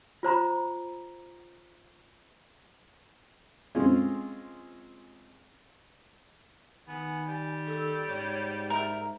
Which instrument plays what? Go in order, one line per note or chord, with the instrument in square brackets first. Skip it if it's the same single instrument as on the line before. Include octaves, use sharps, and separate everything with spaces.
[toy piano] F4 C5 A#5 B5
[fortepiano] G#3 C4 C#4 F4
[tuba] D#3 [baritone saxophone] B3 [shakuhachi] G#5
[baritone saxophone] G3
[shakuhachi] A4
[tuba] G#2 [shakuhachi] C#5
[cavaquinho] A#4 [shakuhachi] E5